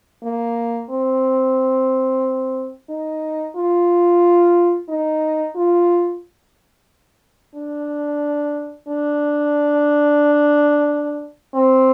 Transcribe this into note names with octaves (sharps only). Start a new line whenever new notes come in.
A#3
C4
D#4
F4
D#4
F4
D4
D4
C4